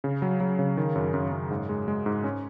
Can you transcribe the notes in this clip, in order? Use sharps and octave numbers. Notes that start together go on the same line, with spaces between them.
C#3
F#3
F#3
C#3
D#3
F#2
F#2
F#2
G#2
G#3
G#3
G#2
C#4